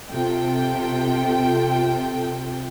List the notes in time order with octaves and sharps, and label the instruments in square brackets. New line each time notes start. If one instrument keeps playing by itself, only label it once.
[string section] C3 F4 A4 G5